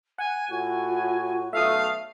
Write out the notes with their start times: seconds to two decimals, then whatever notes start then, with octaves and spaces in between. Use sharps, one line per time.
0.18 F#5 G#5
0.51 A2 F4 F#4 G#5
1.53 B1 A3 E5 F5 D#6